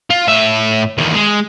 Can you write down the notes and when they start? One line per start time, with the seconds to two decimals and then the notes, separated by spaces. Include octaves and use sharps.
0.10 F4
0.28 A2 E5
0.98 E2 D#3
1.14 G#3